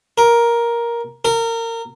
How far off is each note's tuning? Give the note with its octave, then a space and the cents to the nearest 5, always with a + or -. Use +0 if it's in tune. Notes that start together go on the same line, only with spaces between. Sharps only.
A#4 +10
A#4 -25